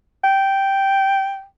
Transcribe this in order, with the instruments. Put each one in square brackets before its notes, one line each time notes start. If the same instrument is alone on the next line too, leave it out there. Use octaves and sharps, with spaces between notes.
[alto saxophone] G5